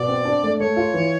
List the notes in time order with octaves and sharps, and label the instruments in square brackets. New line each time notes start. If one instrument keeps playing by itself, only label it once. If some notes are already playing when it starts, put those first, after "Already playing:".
Already playing: [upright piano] B2 [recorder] D5
[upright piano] C4
D4
A3
[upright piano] A3 [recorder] C#5
[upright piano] F4
E3